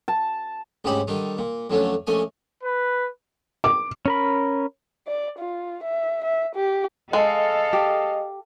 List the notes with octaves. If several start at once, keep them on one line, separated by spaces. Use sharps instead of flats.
A5
D2 G#2 C#3 D#4 G4 B5
D3 D#3 G3 D#4
A#2
F2 D3 F#3 A3 C#4
A#1 A3 C#4 D#5 G#5
B4
D6
C#4 A#4 B5
D5
F4
E5
E5
G4
G#3 A4 D#5 F5
G4